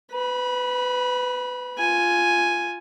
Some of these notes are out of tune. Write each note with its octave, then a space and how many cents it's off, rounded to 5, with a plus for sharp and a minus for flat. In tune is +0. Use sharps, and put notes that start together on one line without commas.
B4 +25 B5 -25
F4 -5 G#5 +0